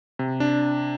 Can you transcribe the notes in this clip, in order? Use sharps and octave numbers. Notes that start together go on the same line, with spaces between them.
C3
D4